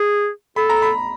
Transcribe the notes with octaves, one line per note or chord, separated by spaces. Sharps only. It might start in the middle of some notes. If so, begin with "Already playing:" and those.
Already playing: G#4
A4 B5
A#5
B5